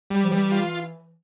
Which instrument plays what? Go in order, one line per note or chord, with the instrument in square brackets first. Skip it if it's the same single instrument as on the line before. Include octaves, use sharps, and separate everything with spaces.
[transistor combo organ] G3
[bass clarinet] F3
[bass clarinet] E3 [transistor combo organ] G3
[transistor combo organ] F4